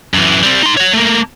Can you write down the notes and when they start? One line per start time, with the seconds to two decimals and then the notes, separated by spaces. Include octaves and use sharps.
0.14 F#2 E3
0.43 G3 C4
0.63 D#4 C6
0.77 C#5 F#5
0.93 A3 A#3